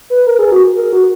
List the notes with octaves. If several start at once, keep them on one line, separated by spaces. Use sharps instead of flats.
B4
A#4
G#4
F#4
A#4
F#4